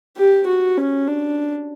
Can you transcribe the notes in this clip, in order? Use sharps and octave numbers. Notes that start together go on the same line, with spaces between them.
G4
F#4
C#4
D4